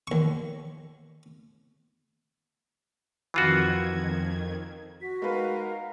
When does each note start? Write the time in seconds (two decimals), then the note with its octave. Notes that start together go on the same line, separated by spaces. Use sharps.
0.07 D#2 C#6
3.34 F2 D#3 E3 F4 F#4 G#6
5.01 F#4 B6
5.22 G#3 D#4 A#4 B4 F5